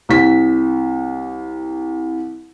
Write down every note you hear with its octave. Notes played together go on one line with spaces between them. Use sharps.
C2 B6